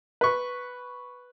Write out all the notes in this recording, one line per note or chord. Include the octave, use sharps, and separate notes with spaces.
B4 C#6